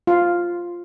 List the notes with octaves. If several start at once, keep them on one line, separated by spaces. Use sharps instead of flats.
F4